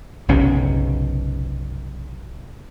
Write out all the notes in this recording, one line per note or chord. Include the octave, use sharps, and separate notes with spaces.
F#1 B1 C3 C#4